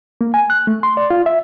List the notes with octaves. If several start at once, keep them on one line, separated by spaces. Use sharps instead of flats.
A#3
G#5
F#6
A3
C6
D5
F4
E5